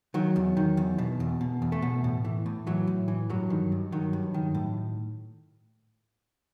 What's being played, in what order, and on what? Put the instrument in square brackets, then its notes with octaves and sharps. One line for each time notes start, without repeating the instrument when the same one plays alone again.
[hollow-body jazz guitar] D#3 F#3
E2
D#3
E2
B2
E2
B2
E2
A3
B2
A2
E3
A2
E3 F#3
A2
E3
G2 F#3
D#3
G2
D#3 F#3
G2
D#3
A2